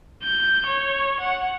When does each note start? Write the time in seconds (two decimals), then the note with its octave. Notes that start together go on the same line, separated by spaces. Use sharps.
0.23 G6
0.66 C#5
1.20 F#5